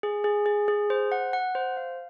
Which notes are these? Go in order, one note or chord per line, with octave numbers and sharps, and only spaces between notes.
G#4
G#4
G#4
G#4
C5
F#5
F#5
C5
F5